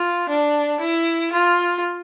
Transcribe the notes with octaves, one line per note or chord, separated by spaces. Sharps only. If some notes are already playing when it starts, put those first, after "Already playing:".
Already playing: F4
D4
E4
F4